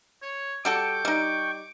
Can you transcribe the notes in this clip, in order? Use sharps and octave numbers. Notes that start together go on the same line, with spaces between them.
C#5
G3 F#4 A4 G5 C#6 D6
G3 D#4